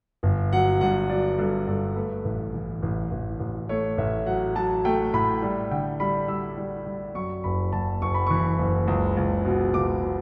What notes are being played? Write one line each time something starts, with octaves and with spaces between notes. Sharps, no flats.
G1
F#3 F#5
G2 F#5
F#3 D5
G2 A4
G2 A4
A3 B4
A1
E3
A1
A1
A1
A3 C#5
A1 E5
F#3 F#5
F#3 A5
A3 G5
A2 B5
G3
D3 G5
G3 B5
G3 E6
G3
G3
F#2 C#6
F#1 B5
F#1 A5
F#1 C#6
B5
E3 C#6
F#1
C#2
C#2
B2
C#2 D6
B2